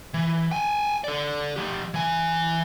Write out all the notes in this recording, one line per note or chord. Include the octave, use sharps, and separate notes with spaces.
E3
G5 G#5
A4 D5
F3 G4
E3 G#5